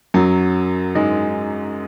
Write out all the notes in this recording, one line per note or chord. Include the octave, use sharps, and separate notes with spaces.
F#2 F#3
G#2 G#3